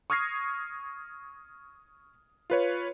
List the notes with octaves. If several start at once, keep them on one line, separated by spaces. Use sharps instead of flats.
C#6 D#6 F6 G#6 A#6 C7
F4 B4 C#5